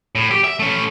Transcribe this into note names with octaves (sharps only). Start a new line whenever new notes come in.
A2
G4
E5
A3 C#4